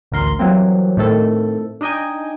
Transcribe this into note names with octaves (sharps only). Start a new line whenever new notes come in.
A1 D2 A#4 C6
E3 F#3 G3 A#3 C4
A2 D#3 A3 C4 A4
D4 D#4 D#5 G5 G#5